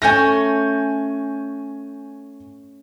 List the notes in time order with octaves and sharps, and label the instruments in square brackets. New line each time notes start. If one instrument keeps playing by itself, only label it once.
[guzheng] A3 C#4 [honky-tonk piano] G#5 G6 A#6